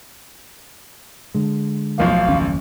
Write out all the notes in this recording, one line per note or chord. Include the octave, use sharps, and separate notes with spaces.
D3 G#3
D1 B1 F3 F5
F#1 D#2 C#4